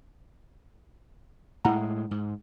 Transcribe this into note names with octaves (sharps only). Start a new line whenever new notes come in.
A2 G#3 E4 F#5 A#5
G#2